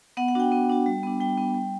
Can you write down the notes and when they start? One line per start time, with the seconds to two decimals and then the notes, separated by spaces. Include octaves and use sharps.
0.17 B3 F#5
0.28 F#5
0.35 D4 F#4 G5
0.52 B3
0.69 D4 F#4
0.86 G3
1.03 B3 D4
1.20 G3 G5
1.37 B3 D4
1.54 G3